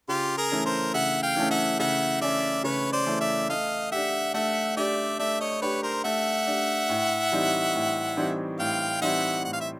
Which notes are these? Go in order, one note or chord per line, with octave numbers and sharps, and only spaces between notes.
C#3 F4 G4
G#4 A#4
E3 A3 C#4
A#4 C5
C#3 E5 F#5
F5 G5
E3 A3 C#4
E5 F#5
C#3 E5 F#5
E3 A3 C#4 D5 E5
C#3 B4 C#5
C5 D5
E3 A3 C#4
D5 E5
A3 D#5 F5
D4 G4 E5 F#5
A3 E5 F#5
D4 G4 D5 E5
A3 D5 E5
C#5 D#5
D4 G4 B4 C#5
A#4 C5
A3 E5 F#5
D4 G4
A2
E3 G3 C4 D#4
A2
E3 G3 C4 D#4
A2 F5 G5
E3 G3 C4 D#4 E5 F#5
A2 F#5
F5
E5